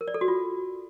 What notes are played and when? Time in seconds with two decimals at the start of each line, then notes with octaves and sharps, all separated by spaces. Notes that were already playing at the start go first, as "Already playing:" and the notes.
0.01 A#4
0.08 D5
0.14 A4
0.21 F#4
0.28 F4